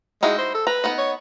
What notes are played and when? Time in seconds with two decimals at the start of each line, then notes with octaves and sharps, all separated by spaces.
0.23 G#3 D#4 E4 F#4
0.38 C5
0.54 A4
0.67 B4 A#5
0.84 B3 D#4 D#5
0.98 C#5